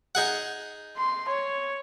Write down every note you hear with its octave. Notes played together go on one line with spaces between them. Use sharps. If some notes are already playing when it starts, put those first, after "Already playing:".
D#4 G#4 F#5
C6
C#5